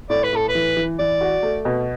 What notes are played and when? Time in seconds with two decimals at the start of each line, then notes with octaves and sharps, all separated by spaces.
0.10 A2 D5
0.24 B4
0.33 A2 A4
0.49 B4
0.55 E3
0.77 E3
0.99 E3 D5
1.21 F#4
1.43 A3
1.65 B2